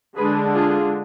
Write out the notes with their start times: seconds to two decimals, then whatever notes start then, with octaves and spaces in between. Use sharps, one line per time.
0.17 D3 G#3 D4 G#4 B4
0.53 F4 G#4